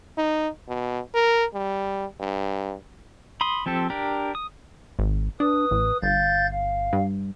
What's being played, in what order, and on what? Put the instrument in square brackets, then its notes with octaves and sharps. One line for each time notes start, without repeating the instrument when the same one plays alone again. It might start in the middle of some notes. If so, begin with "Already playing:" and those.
[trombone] D#4
B2
A#4
G3
G2
[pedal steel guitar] B5 C6 D#6
F3 C4 G4 A4
D4 G4 A#4
D#6
[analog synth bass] G#1
[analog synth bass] D4 [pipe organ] B4 D#6
[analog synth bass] A1
[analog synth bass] G1 [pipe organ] F5 G6 A6
[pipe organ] F5
[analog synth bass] G2